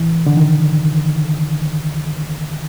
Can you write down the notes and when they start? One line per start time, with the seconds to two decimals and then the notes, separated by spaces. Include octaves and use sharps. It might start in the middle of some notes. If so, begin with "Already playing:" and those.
Already playing: E3
0.26 D3
0.37 D#3